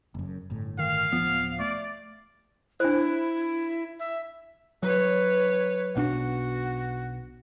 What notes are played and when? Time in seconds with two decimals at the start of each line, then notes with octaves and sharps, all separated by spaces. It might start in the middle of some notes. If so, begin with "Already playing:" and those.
0.15 F#1 F#2
0.50 G1 A2
0.79 D#3 F5
1.12 D1 G#1 F3 B3
1.60 A3 D5
2.80 D4 E4 C5
4.00 E5
4.83 F#3 B4 C#5
5.96 B1 B2 D4 F#4